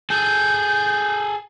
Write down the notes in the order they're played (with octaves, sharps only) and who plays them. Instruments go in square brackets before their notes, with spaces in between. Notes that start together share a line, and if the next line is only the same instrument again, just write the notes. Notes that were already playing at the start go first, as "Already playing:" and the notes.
[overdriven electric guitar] G#4 A4 [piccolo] G6